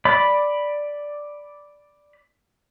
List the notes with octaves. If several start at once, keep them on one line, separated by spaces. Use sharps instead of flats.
D5 B5